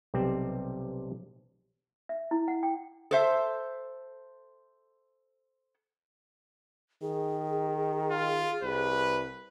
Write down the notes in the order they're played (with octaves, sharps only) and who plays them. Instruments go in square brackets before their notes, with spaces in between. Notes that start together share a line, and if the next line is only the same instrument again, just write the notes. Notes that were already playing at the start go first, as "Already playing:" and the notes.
[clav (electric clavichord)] B1 C3 G3 C4 C5
[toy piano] E5
E4
F#5
G5
[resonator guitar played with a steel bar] A4 C5 E5
[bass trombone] D#3 [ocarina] G#4
[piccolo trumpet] F4
[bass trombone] C2 [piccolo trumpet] B4